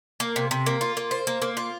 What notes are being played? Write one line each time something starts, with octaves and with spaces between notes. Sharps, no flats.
A#3
C3
C3
A#3
F4
A#3
C5
A#3
A#3
F4